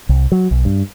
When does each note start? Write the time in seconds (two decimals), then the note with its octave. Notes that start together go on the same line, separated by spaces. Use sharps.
0.09 C2
0.32 F#3
0.51 B1
0.65 G2